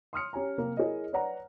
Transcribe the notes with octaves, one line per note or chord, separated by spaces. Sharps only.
C6 D#6 F6 C#7
C#4 G4 C#5 G#5 A#5
C3 A#3 C4
E4 G#4 A#4 C#5 D#5
B4 C#5 D5 F#5 A#5